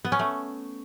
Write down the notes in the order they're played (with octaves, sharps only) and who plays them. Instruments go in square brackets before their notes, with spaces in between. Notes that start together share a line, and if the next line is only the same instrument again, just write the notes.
[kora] B3
C#4
A3